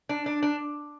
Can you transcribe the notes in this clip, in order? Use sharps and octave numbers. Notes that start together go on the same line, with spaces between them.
D4
D4
D4